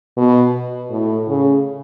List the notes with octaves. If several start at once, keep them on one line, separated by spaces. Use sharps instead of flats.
B2
A2
C#3